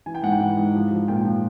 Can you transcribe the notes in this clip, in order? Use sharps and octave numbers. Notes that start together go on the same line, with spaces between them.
E3 G#5
G5
G#2 F#5
G5
E3
G#2
F3
F3
A#2 G5
F3